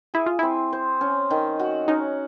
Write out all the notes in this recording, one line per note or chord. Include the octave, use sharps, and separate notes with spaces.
E4 G#4
F4
C4 E4
C5
C#4
D#3
F#4
C#4 D#4